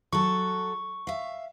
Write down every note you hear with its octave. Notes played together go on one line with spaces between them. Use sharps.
F#3 A4 C#6
E5 F5